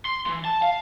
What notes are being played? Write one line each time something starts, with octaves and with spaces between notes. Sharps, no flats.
C6
E3
A5
F5